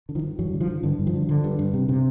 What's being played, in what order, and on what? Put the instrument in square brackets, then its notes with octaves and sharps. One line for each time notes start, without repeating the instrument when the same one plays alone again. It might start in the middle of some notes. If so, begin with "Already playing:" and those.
[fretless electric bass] D3
D#3 F3
G2
G2 E3 F#3
D3
D#3 F3
D3
G2 D3 E3
G2
D#3 F3
D3
D3
G2
G2
C3
C3